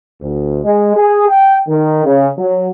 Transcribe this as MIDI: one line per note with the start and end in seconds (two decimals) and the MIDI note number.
0.21 0.60 38
0.64 0.92 56
0.96 1.27 68
1.29 1.57 79
1.68 2.04 51
2.05 2.28 49
2.38 2.69 54